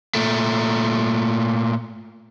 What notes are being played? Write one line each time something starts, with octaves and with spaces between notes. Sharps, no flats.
A#2 A3